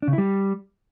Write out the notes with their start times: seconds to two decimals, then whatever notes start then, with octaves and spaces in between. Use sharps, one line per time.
0.02 D4
0.08 C#3
0.13 E4
0.18 G3